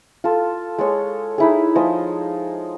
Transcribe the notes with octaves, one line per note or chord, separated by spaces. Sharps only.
F4 A4
G#3 A4 C#5
D#4 E4 G#4
F3 D#5 G#5